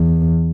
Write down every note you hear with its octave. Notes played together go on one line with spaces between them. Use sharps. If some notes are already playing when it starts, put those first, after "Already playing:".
Already playing: E2